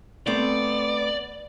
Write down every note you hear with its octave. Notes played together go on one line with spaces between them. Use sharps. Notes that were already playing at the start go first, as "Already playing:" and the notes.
A3 B3 C4 D5